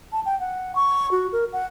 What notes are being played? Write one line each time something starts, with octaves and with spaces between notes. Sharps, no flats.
A5
G5
F#5
C#6
F#4
A#4
F#5